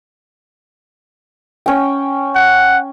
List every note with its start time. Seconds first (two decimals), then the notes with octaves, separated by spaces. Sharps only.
1.66 C#4 G5
2.35 F#5